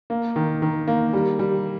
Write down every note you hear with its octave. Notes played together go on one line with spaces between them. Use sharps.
A#3
D#3
D#3
A#3
G3
G3